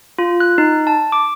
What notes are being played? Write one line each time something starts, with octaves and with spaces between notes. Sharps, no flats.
F4
F#6
D#4
A5
D6